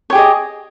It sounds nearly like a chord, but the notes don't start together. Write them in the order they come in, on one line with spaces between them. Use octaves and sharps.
C#5 G4 G#4 D#5